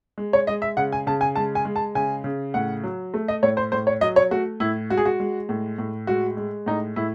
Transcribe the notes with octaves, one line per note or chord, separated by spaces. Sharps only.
G#3
C#5
G#3 D#5
E5
C#3 F#5
G#5
C#3 A5
G#5
G#3 A5
G#5
G#3
A5
C#3 G#5
C#3
A2 F#5
F#3
A3
D#5
A2 C#5
C5
A2 C5
C#5
F#3 D#5
C#5
A3 F#4
A2 E4
G#3 F#4
G#4
F#4
G#3
A2
A2
G#3 F#4
G#3
A2 D#4
A2 E4